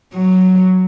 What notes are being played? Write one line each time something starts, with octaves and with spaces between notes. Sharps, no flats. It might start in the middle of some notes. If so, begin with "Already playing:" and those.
F#3